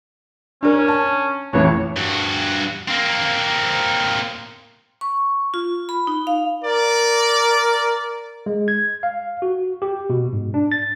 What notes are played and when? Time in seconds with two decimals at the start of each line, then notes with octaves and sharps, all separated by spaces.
0.63 C#4 D4 A#4
0.88 A5
1.53 A1 F2 E3 C#5
1.96 G2 F#4
2.88 A#3 C4
5.01 C#6
5.54 F4
5.89 B5
6.07 D#4
6.27 F5
6.64 A#4 D5
8.46 G#3
8.68 G#6
9.03 F5
9.42 F#4
9.82 G4
10.10 B2
10.33 G#2
10.54 D4
10.72 A6